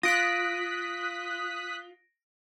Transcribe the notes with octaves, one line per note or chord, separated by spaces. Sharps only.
F4 D#6 F#6 A#6 B6 D7